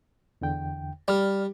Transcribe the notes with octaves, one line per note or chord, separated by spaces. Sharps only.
E2 D3 G5
G3 D5 F6